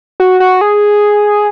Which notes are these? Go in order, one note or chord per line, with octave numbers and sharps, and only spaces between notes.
F#4
F#4
G#4